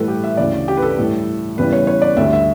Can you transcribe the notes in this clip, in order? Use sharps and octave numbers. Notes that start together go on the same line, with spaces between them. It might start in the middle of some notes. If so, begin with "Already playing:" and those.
Already playing: A2 E3 G3 A4 B4
G4
E5
D2 C#3 E3 D5
G4
B4
A4
A2 E3 G3
E2 C#3 E3 G3 B4
C#5
C#5
D5
D2 D3 G3 E5
E5